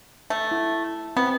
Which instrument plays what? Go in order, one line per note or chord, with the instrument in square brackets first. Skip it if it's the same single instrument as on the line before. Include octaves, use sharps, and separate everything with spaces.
[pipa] A3
[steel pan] E4
[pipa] B3 [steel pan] C4